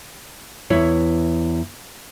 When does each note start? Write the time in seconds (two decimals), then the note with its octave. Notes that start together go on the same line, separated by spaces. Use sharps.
0.70 E2 E4 C#5